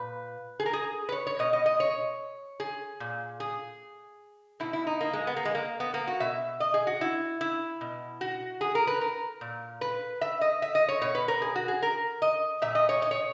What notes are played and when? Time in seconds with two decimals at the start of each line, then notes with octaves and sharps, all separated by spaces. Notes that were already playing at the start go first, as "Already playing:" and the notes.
Already playing: A#2 B4
0.60 G#4
0.66 A#4
0.73 G#4
1.09 B4
1.12 C#5
1.27 C#5
1.39 B2 D#5
1.53 D#5
1.66 D#5
1.80 C#5
2.60 G#4
3.00 A#2
3.40 G#4
4.60 B2 E4
4.73 E4
4.87 D#4
5.01 A#3
5.13 G#3
5.27 B3
5.36 A#3
5.45 G#3
5.55 A#3
5.80 B3
5.94 A#3
6.07 F#4
6.20 B2 E5
6.60 D#5
6.74 G#4
6.87 F#4
7.01 E4
7.41 E4
7.81 B2
8.21 F#4
8.61 G#4
8.75 A#4
8.87 B4
9.01 A#4
9.41 A#2
9.81 B4
10.21 E5
10.41 D#5
10.62 E5
10.75 D#5
10.88 C#5
11.02 B2 C#5
11.15 B4
11.28 A#4
11.42 G#4
11.56 F#4
11.68 G#4
11.82 A#4
12.22 D#5
12.62 A#2 E5
12.75 D#5
12.89 C#5
13.02 D#5
13.11 C#5